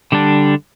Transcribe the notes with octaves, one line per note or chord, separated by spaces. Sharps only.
D3 G3 D4